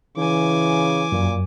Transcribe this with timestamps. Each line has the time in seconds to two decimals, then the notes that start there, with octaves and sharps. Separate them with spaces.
0.17 C#3 E3 G#5 D6
1.12 F#2 A#2